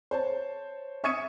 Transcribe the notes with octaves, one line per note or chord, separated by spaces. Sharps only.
C5 C#5 A5
E5 C#6 D#6 G#6 C#7 D#7